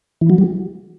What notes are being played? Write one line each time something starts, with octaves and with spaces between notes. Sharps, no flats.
E3
F#3
G3